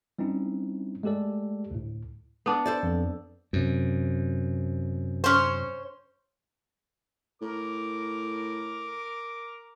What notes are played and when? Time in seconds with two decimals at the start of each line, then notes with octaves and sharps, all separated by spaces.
0.19 G3 C4 C#4 D#4 E4
1.03 G#3 A3 G4 A4 D5
1.71 D2 A2
2.46 B3 D4
2.66 A4 C5 D5
2.83 F2
3.53 F#2 C3
5.24 C#4 C5
7.42 A2 A#4 D6